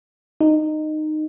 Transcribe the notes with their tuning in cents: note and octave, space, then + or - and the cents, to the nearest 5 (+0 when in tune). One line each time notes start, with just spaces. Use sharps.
D#4 -15